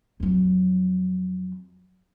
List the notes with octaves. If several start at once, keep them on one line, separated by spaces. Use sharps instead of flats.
F2 F#3